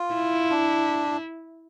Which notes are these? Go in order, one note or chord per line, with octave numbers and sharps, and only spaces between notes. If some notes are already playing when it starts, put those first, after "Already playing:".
Already playing: F4
E4
D4